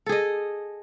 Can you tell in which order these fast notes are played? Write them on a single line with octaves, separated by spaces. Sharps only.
A4 G#4 D#5